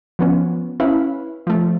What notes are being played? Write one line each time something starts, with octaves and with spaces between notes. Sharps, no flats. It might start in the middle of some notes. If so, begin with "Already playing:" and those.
F3 B3 C#4
C#4 E4 B4 F5 B5
F3 A3